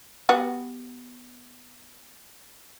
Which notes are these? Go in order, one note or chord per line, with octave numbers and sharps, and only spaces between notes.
G3 B3 F#4